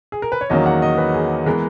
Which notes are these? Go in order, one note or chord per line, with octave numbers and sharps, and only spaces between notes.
G#4
A#4
B4
C#5
E2 D#3 F#3 A#3 C#4 D#5
F#5
D#5
B4
G#4
E3 G#3 B3 A#4